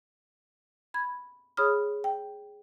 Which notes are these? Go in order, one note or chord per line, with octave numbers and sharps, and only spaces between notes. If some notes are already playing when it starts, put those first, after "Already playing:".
B5 G#6
G#4 C#5 B5 D#6 F6
G5